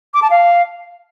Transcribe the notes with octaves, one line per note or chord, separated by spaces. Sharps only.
D6
A5
F5